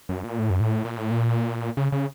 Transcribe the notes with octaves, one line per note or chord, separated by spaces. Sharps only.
F#2
A#2
A2
F#2
A2
A#2
A2
A#2
C#3
C#3